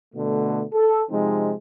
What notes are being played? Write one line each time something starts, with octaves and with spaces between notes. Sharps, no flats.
B2 D3 A3
A4
C3 F3 G#3 C4 D#4